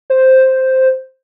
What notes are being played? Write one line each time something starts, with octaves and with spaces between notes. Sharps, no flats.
C5